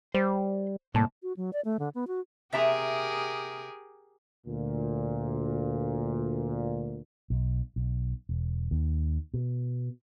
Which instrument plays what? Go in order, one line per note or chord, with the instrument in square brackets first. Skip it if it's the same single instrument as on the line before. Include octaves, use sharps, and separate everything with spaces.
[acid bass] G3 [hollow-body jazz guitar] C5
[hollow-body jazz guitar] C2 A#3 A5 [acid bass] A2
[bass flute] F#4
F#3
D5
A3
D3
B3
F#4
[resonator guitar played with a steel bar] C3 E5 A#5 [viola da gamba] G4 G#4 A#4
[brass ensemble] D2 A#2
[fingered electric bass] B1
B1
E1
D#2
B2